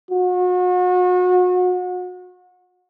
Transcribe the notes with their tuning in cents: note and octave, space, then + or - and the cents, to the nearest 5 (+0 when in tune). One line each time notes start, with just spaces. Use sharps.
F#4 -35